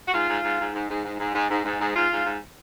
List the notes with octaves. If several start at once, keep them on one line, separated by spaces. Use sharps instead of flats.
F#4
G#2 F4
G#2
G#2
G#2
G#2
G#2
G#2
G#2
G#2
G#2
G#2
G#2
G#2 F4
G#2
G#2